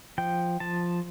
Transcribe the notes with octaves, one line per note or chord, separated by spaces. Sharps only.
F3 G5
F3 A5